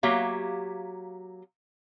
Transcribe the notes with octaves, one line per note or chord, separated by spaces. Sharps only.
F#3 A#3 G4 E5 F5